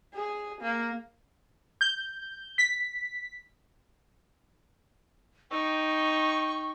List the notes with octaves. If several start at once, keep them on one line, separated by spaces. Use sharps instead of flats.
G#4
A#3
G6
B6
D#4 G5 C#6